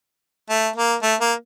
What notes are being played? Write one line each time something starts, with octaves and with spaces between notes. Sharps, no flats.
A3
A#3
A3
A#3